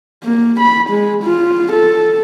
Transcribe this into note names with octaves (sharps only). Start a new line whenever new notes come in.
A#3
B5
G#3
F4
A4